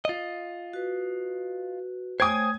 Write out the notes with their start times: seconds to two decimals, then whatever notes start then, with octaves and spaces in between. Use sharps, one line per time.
0.05 F4 D#5
0.73 F#4 B4
2.20 A3 C5 C#5 G5 G#5 D#6 G#6